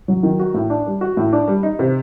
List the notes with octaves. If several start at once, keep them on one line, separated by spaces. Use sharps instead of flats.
F#3
D#3
F#4
A2
D4
G3
F#4
A2
D4
G3
D#4
C3